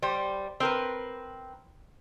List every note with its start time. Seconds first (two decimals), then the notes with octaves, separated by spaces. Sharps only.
0.02 G3 C5
0.60 C4 A#4 B4